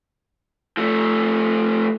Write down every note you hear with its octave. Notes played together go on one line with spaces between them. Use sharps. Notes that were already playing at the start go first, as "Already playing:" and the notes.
F3 A3